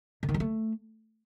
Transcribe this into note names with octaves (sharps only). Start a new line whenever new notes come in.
D3
D#3
G3
A3